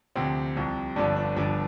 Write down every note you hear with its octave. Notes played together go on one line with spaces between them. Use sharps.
D2 C3 F3 C4
C2 C3 F3
G1 G2 D3 F3 D4
D4
G1 G2 F3 D4